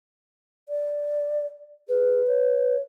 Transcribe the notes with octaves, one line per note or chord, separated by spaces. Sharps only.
D5
G#4 B4
C#5